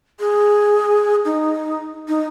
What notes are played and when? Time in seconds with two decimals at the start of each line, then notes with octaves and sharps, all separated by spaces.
0.20 G#4
1.25 D#4
2.08 D#4